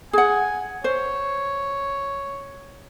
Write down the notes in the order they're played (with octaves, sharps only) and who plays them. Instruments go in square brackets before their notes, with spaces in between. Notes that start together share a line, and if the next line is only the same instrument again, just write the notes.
[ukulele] G#4 F#5 [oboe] G#5
[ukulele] C5 [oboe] C#5